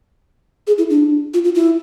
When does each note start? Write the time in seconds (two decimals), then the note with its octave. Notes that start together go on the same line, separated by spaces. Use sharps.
0.67 G#4
0.78 E4
0.90 D4
1.34 F4
1.44 F4
1.55 E4